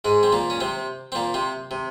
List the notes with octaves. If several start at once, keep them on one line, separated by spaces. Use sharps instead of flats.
G#2 G#3
C4
A#2 A#3
C#4
C3 C4
C4
A#2 A#3
C3 C4
C3